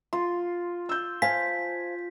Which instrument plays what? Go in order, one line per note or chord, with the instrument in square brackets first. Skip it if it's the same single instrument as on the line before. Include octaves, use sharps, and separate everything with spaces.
[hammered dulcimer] F4 [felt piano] C6
[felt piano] E6 G6
[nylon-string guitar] C5 F5 A5 [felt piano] G#5 [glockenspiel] B6